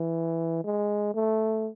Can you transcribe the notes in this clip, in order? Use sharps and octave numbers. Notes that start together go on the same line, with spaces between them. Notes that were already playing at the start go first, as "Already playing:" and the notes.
Already playing: E3
G#3
A3